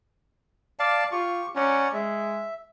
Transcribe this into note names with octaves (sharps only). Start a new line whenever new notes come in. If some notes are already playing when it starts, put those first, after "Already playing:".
D5 F5 A5
F4 G4 C#6
C#4 D5 F#5 A#5
G#3 E5